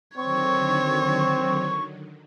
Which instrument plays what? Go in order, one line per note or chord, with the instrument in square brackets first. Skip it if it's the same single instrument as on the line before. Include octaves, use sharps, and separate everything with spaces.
[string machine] D3 D#3 F#3 [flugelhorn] C4 [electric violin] C#5 [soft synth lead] C#6